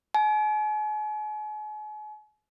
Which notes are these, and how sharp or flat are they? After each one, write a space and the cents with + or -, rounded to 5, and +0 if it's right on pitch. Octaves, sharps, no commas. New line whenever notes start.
G#5 +40